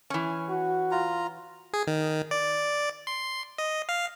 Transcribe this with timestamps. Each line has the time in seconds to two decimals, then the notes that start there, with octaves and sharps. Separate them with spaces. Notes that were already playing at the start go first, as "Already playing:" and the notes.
0.10 E3 C#4
0.49 F#4
0.91 F4 A#5
1.74 G#4
1.87 D#3
2.31 D5
3.07 C6
3.58 D#5
3.89 F5